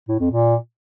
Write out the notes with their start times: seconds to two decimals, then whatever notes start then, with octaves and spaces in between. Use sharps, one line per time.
0.08 A2
0.20 F2
0.31 A#2